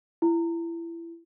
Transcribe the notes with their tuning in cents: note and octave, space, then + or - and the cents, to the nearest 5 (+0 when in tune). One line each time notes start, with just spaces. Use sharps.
E4 +25